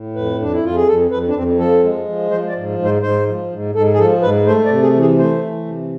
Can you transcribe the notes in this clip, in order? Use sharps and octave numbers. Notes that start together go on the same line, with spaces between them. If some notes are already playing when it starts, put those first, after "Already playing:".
Already playing: A2
F2 B4
F2 D4
E4
F2 F4
G#4
F2 A4
F2 B4
D4
F2 C4
F3 A4
G#3
F3
F3 C5
D5
G#2
G#2
C5
G#2 C5
F3
G#2
G#2 A4
G#4
F3 A4
G#2 B4
A3 C5
D5
C3
G#4
E3
G#4
A3 C5
E3
C3